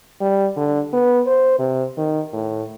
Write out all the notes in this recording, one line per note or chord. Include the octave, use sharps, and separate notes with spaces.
G3
D3
B3
C5
C3
D#3
A2